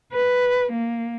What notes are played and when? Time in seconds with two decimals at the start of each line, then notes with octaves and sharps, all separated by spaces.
0.12 B4
0.72 A#3